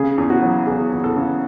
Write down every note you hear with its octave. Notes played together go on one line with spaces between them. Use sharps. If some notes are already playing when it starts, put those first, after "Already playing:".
Already playing: C#3 G#4
E2
F#4
F#3
E2 G#4
E2
A4
C#3